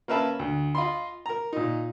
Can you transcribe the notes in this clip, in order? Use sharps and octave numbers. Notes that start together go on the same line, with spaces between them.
A#3 C#4 A#4 B4 E5 A5
D2
F4 D#5 B5 C6
A#4 A#5
A#2 D#4